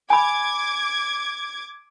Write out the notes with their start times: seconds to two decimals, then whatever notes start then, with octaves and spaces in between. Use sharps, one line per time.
0.10 G#5 B5 D6 G#6